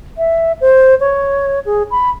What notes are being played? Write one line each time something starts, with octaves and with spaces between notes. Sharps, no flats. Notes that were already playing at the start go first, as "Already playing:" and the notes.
E5
C5
C#5
G#4
B5